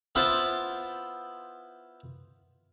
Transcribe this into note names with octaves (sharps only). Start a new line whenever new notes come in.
B3 E4 F4 C5 F5 A5